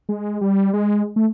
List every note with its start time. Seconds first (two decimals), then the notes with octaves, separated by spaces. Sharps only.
0.09 G#3
0.41 G3
0.73 G#3
1.16 A3